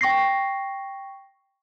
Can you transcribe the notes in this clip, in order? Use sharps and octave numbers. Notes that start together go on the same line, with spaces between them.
G5 C#6 A#6 C7